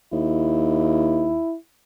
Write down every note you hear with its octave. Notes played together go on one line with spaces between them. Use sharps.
D#2 E4